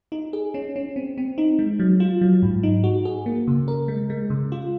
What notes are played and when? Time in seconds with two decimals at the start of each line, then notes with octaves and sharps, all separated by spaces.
0.12 D#4
0.33 G#4
0.54 C#4
0.76 C#4
0.96 C4
1.18 C4
1.38 D#4
1.59 G#3
1.79 F#3
2.00 F4
2.21 F#3
2.42 G#2
2.63 D#4
2.84 F#4
3.05 G#4
3.26 A#3
3.47 C#3
3.68 A#4
3.88 G#3
4.10 G#3
4.30 C#3
4.52 F4